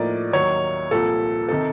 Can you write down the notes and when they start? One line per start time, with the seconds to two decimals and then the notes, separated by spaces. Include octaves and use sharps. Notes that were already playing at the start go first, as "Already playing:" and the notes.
Already playing: A2 F3 A#3 D#4 D5
0.33 D#2 D#3 F#3 C#5
0.91 C2 A#2 F3 A4
1.49 C3 D#3 A4